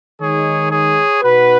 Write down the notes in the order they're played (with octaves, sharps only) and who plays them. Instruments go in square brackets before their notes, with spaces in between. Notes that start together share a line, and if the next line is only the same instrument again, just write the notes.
[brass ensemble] D#3 G#3 D#4 G#4 C#5
G#4 C#5
B2 B3 D#4 F#4 B4